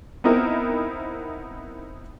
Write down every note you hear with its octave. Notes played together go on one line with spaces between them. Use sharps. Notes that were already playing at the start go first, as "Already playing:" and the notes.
B3 C4 D#4 E4 A#4